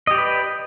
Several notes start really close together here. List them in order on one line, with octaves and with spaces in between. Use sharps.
D#5 G4 D5 B4